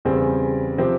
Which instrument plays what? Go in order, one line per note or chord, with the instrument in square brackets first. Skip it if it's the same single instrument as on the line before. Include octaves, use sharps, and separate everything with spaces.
[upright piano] E2 C#3 G3 C4
C3 F3 C4 G4